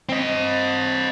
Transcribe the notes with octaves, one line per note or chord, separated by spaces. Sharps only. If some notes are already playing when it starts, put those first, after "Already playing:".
C4 D#5